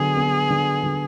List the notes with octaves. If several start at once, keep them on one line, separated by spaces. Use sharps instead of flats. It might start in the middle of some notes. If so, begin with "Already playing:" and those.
Already playing: D3 F#3 B3 G#4
B3
D3
D3